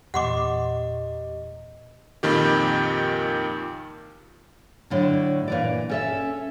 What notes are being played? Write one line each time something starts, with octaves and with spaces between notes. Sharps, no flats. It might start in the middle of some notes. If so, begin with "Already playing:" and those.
E2 A#2 G4 D#5 F#5 C6 D6
F2 A#2 D#3 G4
A2 D3 F#3
A#2 E3 D5
C#4 A4 E5